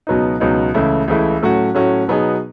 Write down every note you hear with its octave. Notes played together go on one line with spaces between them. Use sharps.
C#2 B2 F#3 B3 D#4
C#2 B2 F#3 B3 D#4
C#2 C#3 E3 A3 E4
C#2 C#3 E3 A3 E4
A2 F#3 A3 C#4 F#4
A2 F#3 A3 C#4 F#4
B2 F#3 B3 D#4 G#4